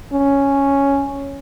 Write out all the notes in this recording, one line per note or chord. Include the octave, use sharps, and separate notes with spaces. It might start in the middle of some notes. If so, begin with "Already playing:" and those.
C#4